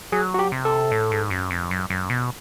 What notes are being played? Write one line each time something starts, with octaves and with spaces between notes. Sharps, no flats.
F#3 G#4
F#4
G4
C3
A4
A2
G#2
F#2
F2
F#2
F#2
B2